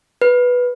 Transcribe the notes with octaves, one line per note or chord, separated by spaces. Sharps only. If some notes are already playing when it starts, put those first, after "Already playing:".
B4